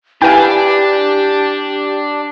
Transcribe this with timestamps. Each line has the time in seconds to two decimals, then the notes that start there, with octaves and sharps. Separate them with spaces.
0.22 D4 E4 G4 B4 F5 G5 G#5